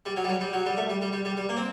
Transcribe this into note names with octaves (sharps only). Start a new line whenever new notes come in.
G3
F#3
G3
F#3
G3
F#3
G3
A3
G3
G3
G3
G3
G3
A#3
C4